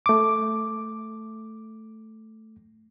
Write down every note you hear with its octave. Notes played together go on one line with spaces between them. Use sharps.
A3 D6